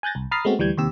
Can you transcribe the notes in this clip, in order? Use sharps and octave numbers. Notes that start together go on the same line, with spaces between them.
G#5 F#6 G6 A6 A#6
C2
A#5 B5 D#6 F6 A6 C7
G#3 A3 B3 C4 F#4
D2 E3 G3 G6 G#6
D#2 C3 G4 E6